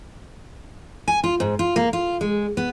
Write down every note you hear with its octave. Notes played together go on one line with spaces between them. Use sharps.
G#5
F4
G#2
F4
A#3
F4
G#3
B3